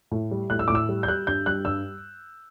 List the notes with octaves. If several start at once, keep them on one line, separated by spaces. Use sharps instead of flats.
A2
G3
A2 F#6
E6
A2 D6
E6
G3
G6
G3 F#6
G2 G6
G3 F#6
G2 E6